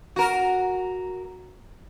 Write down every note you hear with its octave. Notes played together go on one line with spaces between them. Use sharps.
F#4 A#4